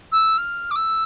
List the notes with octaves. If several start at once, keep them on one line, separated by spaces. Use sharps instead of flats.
E6
F6
D6
E6